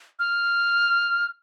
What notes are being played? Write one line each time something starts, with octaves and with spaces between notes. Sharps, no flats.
F6